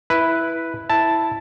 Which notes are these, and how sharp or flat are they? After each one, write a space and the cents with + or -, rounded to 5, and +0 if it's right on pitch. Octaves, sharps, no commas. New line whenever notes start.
E4 +0 B4 +0
E4 +0 A5 +0